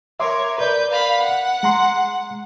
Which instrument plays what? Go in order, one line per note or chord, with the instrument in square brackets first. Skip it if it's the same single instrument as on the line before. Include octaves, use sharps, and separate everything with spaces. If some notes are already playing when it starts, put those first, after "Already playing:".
[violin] A#4 C#5 [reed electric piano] E5 C6 D6
[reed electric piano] A#4 D5 [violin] B4 G6
[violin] F5 B5
F#5
[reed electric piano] G#3 A#5 C6